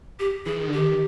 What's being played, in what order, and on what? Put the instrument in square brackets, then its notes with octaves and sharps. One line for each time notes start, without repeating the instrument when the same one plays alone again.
[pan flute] G4
[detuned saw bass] E3 [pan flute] G#4
[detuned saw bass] D#3
D3
[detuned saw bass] D#3 [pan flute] G4